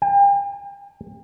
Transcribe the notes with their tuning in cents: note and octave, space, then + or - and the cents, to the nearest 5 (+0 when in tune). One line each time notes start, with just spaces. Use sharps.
G5 +40